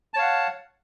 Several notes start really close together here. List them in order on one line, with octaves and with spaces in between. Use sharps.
A5 C#5 F5 F#5